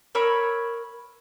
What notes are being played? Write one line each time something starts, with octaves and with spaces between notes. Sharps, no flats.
A#4 C#5 B5 E6